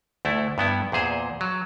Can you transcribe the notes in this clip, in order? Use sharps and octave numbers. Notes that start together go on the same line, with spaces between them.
D2 A3 E4
G2 B3 E4
E2 A#2 G#4 C5
F#3